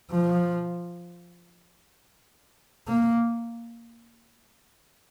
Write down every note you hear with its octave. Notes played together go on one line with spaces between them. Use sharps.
F3
A#3